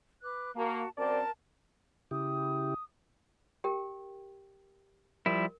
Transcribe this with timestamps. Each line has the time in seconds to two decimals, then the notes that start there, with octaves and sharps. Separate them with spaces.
0.22 B4 D6 F#6
0.56 A#3 F#4 A5
0.97 F#2 C4 A#4 D5 A5
2.11 C#3 E4 G4 D#6
3.64 G4 A#4 G5
5.26 F3 G3 E4 A#4